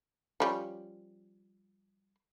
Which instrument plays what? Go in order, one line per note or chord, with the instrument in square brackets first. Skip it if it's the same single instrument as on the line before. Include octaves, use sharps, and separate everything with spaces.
[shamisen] F3 G3 C#4